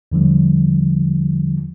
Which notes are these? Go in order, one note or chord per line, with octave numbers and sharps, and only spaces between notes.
E2 D3 F3 G3